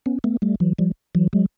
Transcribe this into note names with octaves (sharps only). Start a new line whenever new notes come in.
B3 C#4
A3 B3
G3 A3
E3 F#3
F3 G3
E3 F#3
F#3 G#3